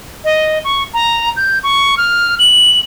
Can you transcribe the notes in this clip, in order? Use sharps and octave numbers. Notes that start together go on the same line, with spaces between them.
D#5
C#6
A#5
G6
C#6
F6
F#7